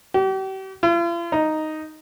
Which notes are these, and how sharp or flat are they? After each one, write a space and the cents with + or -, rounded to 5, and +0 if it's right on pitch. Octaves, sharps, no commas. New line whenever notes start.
G4 -40
F4 -45
D#4 +0